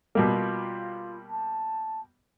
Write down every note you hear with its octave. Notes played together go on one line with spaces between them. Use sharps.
B2 G3 A#3 F4
A5